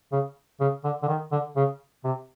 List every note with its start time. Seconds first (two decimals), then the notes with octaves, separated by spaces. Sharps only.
0.12 C#3
0.60 C#3
0.84 D3
1.03 D3
1.08 D#3
1.32 D3
1.57 C#3
2.05 C3